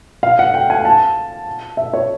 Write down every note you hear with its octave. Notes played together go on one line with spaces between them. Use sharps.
F5
F#5
G5
G#5
A5
E5
C#5